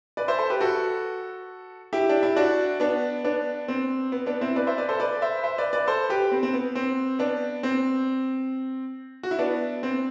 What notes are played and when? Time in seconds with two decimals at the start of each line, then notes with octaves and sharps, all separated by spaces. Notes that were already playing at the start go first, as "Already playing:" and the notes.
0.17 B4 D5
0.28 C5 E5
0.38 A4 C5
0.50 G4 B4
0.61 F#4 A4
1.93 E4 G4
2.09 D4
2.23 E4
2.36 D4 F#4
2.80 B3 D4
3.24 B3 D4
3.68 C4
4.12 B3
4.26 B3 D4
4.41 C4 E4
4.56 B4 D5
4.67 C5 E5
4.78 B4 D5
4.89 A4 C5
5.00 B4 D5
5.22 C5 E5
5.44 C5 E5
5.58 B4 D5
5.73 B4 D5
5.87 A4 C5
6.10 G4 B4
6.32 C4
6.43 C4
6.54 B3
6.75 C4
7.19 B3 D4
7.63 C4
9.23 F#4
9.31 E4
9.39 B3 D4
9.83 C4